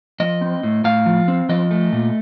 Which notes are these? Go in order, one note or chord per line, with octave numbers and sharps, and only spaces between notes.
F3 D#5
C4
A2
A2 F5
F3
C4
F3 D#5
A3
A#2